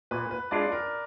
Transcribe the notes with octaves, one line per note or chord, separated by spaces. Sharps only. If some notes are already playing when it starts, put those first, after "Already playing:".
A#2 B4
B4
G#3 D4 F4 D5
A#4